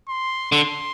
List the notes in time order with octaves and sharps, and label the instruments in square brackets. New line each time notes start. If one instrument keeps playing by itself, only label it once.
[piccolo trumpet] C6
[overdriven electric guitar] D3 [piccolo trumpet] C6